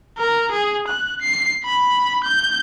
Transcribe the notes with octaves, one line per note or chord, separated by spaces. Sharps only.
A#4
G#4
F#6
C7
B5
G6